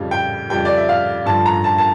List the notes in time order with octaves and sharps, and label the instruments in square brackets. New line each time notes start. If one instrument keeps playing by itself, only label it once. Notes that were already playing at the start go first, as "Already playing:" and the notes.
Already playing: [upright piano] F2 C#3 G3
G5
F2 C#3 G3 G5
D5
E5
F5
G2 D3 F3 A5
A#5
A5
A5